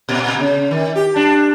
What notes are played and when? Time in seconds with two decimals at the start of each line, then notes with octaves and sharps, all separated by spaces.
0.09 A#2
0.40 C#3
0.71 D#3
0.96 G4
1.16 D4